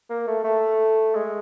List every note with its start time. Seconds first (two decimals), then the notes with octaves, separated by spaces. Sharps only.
0.10 A#3
0.28 A3
0.44 A3
1.15 G#3